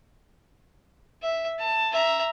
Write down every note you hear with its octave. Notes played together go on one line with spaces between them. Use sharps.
E5
A5
E5 A#5